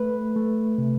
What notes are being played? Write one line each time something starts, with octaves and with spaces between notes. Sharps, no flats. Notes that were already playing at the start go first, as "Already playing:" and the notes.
Already playing: A3 B4
A3
C3